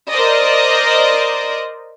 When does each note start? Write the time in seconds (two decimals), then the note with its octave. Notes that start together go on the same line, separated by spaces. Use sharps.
0.12 A#4 C5 D5 D#5